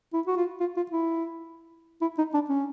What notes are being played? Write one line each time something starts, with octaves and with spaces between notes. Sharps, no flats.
E4
F#4
F4
F4
F4
E4
E4
D#4
D4
C#4